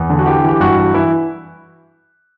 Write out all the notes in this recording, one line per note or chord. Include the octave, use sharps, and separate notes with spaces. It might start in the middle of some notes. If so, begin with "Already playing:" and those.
Already playing: E2
D3
F#4
E3 G4
E3
G4
G2 F#4
E3
E3 E4